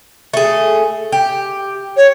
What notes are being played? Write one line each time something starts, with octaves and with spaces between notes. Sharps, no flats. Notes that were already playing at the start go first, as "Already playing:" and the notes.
A3 G#4
G4
C#5